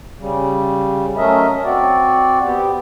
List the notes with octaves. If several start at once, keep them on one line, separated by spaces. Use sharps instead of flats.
C#3 G3
F#3 A3 C#4 A#4 D#5 E5
C4 F#4 D5
B3 G4